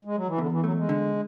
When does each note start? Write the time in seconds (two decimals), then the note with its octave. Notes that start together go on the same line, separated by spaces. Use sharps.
0.05 G#3
0.16 F#3
0.28 E3
0.38 E2 D3
0.52 E3
0.64 F#3 A3
0.77 G#3
0.89 D3